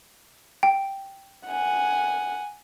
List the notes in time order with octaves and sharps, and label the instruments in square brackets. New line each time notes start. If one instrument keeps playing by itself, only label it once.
[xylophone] G5
[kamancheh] F#5 G#5